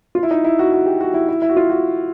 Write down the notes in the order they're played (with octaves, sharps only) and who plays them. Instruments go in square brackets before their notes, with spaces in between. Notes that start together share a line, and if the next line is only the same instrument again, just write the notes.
[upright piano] F4
E4
D#4
E4
F#4
F#4
G4
F#4
E4
E4
E4
F#4
F4
F#4